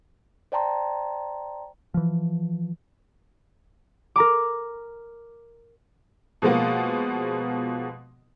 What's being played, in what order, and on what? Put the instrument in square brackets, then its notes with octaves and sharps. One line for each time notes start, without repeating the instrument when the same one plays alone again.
[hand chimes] C5 D5 G5 A5 A#5 C6
[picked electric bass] E3 F3
[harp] A#4 A#5 D6
[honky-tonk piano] B2 F3 G#3 A#3 B3